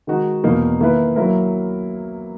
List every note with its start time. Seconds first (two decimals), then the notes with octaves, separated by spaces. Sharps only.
0.07 D#3 G#3 D#4 F#4
0.44 E2 B2 A#3 D#4
0.80 D#3 A#3 E4 B4
1.16 F#3 A#3 E4 A#4